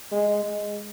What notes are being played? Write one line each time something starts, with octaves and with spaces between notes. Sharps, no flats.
G#3
G#3